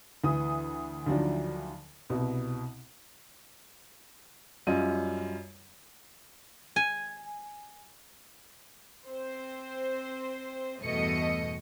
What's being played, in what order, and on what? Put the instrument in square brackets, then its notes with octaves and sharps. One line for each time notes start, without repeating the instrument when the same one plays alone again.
[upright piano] D2 E3 D#6
D2 D#3 F3 F#3 D4
C2 B2
F#2 G3 F4 D#5 D#7
[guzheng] G#5
[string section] C4 C5
E2 G2 B2 A3 D#5 C#7